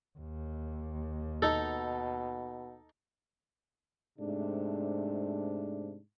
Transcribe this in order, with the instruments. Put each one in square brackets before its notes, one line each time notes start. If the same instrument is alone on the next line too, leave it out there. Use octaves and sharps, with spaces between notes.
[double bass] D#2
[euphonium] B2 [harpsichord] D#4 A4
[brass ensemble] G#2 C3 A3 D4